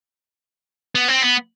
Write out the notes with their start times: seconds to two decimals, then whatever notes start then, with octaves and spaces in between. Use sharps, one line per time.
0.95 B3
1.08 C4
1.22 B3